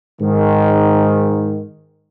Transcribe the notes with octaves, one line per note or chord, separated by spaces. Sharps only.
G#2 D#3